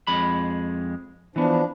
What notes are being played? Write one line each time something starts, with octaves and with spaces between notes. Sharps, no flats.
F2 G#3 B5
E3 F3 B3 D4